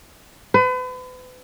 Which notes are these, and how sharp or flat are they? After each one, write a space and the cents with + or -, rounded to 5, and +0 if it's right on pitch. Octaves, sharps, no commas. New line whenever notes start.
B4 +40